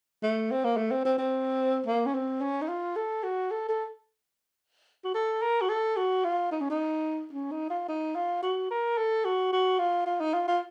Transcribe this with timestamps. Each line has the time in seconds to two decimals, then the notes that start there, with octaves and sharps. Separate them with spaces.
0.23 A3
0.51 C4
0.64 A#3
0.77 A3
0.91 C4
1.05 C4
1.18 C4
1.86 A#3
2.06 C#4
2.15 C4
2.41 C#4
2.62 D#4
2.68 F4
2.96 A4
3.23 F#4
3.51 A4
3.69 A4
5.04 F#4
5.14 A4
5.42 A#4
5.62 F#4
5.69 A4
5.97 F#4
6.24 F4
6.51 D#4
6.61 C#4
6.70 D#4
7.33 C#4
7.51 D#4
7.70 F4
7.88 D#4
8.15 F4
8.42 F#4
8.70 A#4
8.98 A4
9.25 F#4
9.53 F#4
9.79 F4
10.06 F4
10.20 D#4
10.34 F4
10.48 F4